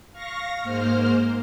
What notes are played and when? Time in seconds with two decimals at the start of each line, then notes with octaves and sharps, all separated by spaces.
0.12 F5 C#6 A#6
0.63 G#2 A#3 C5 F6